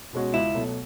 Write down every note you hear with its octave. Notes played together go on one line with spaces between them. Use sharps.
B2 G#3 C#4 F#4
C#2 E4
B2 F#3 A3